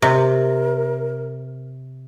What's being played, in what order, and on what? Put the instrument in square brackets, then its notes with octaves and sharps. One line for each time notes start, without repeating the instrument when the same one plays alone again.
[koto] C3 [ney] A#4